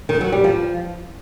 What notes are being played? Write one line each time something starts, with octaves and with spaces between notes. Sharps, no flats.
D#3
F#3
G3
F3